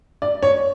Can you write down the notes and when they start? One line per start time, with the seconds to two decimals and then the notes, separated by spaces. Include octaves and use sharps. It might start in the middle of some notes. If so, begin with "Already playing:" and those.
0.22 D5
0.43 C#5